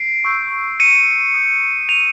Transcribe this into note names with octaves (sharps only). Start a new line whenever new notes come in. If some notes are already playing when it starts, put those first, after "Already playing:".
Already playing: C7 D7
C#6 E6 G6
C#7 D#7
D#6 G6
D#7 F7